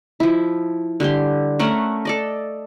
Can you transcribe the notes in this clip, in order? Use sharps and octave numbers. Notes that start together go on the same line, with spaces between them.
F3 E4
D3 G3 G4 C6
A3 C#4 A#4 F#5
A4 D5 D#5